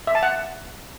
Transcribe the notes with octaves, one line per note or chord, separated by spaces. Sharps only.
E5
A5
F#5